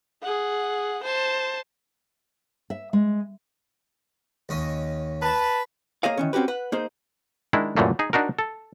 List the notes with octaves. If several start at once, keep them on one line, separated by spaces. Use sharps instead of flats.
G#4 F#5
C5 A5
E5
G#3
D#2 C#4 D#5
B4 A5
A#3 G#4 C#5 D#5 F5
D#3 E3 C#4
C4 C#4 F#4 G4 B4
B4 F#5
A#3 D#4 G#4 C5
D#3 G#3 D4 E4
F#2 A#2 E3 G3 A3 A#3
D#4 G#4
D4 D#4 F#4 A#4
A4